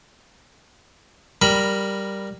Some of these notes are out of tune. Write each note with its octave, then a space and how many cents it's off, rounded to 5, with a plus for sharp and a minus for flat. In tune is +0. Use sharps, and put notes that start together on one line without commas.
G3 +0 A#4 +0 B5 +0